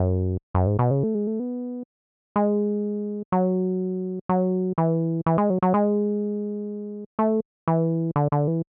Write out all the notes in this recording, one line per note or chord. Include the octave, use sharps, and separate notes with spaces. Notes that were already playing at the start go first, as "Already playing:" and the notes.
Already playing: F#2
F#2
G#2
B2
C#3
A3
G#3
A3
B3
G#3
F#3
F#3
E3
E3
G#3
F#3
F#3
G#3
A3
E3
D3
D3
E3